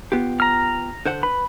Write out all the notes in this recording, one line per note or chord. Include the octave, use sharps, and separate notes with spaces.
B3 F4 G4
A#5 F6
D3 C5 F#5
B4 B5